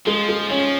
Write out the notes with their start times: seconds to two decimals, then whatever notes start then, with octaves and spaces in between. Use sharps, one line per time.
0.06 F3 G#3
0.29 G#3
0.50 F3 C#4